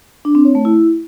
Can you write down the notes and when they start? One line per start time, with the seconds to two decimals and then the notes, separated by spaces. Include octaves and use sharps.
0.25 D4
0.35 C4
0.45 C#5
0.55 A3
0.65 E4